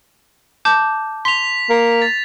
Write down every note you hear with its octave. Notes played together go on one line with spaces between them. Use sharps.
A5 D6 G6
C6 B6 F7
A#3
A6